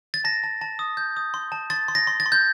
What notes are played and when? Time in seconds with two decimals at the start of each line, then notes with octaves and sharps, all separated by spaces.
0.14 A6
0.24 A5 A#6
0.43 A5
0.61 A5
0.79 D#6
0.97 G6
1.17 D#6
1.34 C6
1.52 A5
1.70 C6 A6
1.88 C6
1.95 A#6
2.07 C6
2.20 A6
2.26 C6
2.32 G6